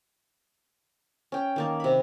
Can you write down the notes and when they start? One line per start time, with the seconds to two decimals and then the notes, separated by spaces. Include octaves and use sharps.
1.32 C#4 G5
1.56 D#3 A#3 A5
1.80 C3 B5